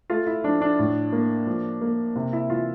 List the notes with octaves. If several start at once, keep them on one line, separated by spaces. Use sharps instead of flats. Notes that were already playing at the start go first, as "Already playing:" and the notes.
A3 F4
E4
F3 D4
D4
A2
A#3
F3
A#3
C3
E4
E3 F4